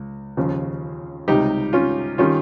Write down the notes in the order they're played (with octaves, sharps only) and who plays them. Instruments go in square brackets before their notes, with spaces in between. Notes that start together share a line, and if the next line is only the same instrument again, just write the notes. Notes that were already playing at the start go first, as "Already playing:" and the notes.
Already playing: [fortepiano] C#2
D#2 C#3 F3
C#2 C3 G3 D#4 G4
C#4 F4
D#3 G3 C#4 F4